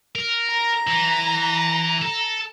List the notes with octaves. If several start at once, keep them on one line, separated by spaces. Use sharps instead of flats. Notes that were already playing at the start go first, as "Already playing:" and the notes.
A#4
A#5
E3
A4